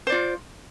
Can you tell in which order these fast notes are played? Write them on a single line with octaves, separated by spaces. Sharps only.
C5 D5 F4